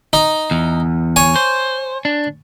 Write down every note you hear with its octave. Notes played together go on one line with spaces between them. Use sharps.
D#4
E2
C#5 G#5
C5
D4